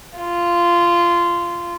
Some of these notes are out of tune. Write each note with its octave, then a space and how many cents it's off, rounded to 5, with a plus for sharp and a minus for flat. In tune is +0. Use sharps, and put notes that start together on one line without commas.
F4 -15